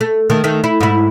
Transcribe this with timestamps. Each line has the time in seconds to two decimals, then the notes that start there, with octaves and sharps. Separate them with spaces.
0.01 A3
0.30 D#3 A3
0.44 D#3 A3
0.64 E4
0.80 G#2 E4